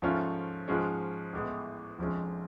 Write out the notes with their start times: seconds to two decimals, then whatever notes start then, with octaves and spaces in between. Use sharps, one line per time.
0.02 G#2 F3 A3 C#4 F4
0.68 G#2 F3 G#3 C#4
1.33 A1 A2 G#3 B3
1.99 F1 F2 F3 G#3 C#4